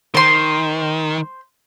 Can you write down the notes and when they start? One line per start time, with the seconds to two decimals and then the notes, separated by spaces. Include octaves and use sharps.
0.15 D#3 C5 C6